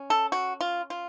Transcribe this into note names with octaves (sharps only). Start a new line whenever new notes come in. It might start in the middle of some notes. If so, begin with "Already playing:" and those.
Already playing: C#4
A4
F#4
F4
F4